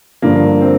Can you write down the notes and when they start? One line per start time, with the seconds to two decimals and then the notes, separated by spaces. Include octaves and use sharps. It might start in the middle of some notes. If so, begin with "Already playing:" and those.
0.22 G2 D3 F3 A#3
0.61 C4